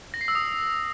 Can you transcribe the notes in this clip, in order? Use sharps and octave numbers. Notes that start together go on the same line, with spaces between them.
A#6
C7
E6
D#6